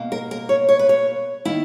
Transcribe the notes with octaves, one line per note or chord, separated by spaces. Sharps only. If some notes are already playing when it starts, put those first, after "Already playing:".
Already playing: B2 A#3
A#4
A#4
C#5
C#5
B4
C#5
D#3 A#3 E4